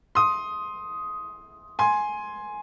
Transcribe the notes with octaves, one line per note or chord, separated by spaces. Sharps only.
C6 D#6
G#5 C6